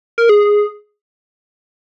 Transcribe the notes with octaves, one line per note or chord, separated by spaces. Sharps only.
A#4
G#4